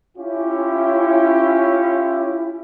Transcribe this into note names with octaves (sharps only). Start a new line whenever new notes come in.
C#4 E4 F4 G4